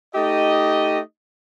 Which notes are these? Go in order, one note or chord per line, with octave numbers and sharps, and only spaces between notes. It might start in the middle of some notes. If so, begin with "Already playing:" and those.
A3 D#4 G4 D#5